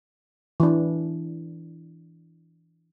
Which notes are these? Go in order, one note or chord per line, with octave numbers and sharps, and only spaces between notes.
E3 D4